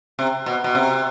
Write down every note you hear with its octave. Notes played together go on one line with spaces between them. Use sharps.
C3
B2
B2
C3